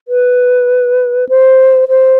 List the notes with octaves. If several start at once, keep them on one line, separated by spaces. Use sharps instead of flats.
B4
C5
C5